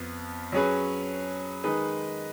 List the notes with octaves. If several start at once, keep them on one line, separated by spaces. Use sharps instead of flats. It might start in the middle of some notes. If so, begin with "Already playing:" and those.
Already playing: F2 F3 B3
F#3 C#4 G#4 B4
D#3 G#3 D#4 G#4 B4